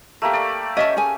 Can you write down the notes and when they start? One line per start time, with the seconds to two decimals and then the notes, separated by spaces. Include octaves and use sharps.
0.22 A3 A#3 G4
0.33 D5
0.77 C#4 D#5 E5 A5
0.97 G#4 G#5